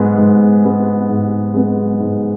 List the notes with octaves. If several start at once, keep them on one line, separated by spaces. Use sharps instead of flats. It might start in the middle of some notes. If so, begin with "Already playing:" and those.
Already playing: G#2 G#3 B3
G#2
G#3 B3
G#2
G#3 B3
G#2